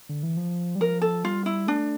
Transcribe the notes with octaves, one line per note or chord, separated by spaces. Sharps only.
D3
E3
F3
G3
F3 A#4
A4
G3 F4
E4
A3 D4